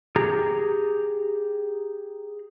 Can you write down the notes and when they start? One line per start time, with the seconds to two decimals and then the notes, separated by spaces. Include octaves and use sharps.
0.16 G4 G#4 A#5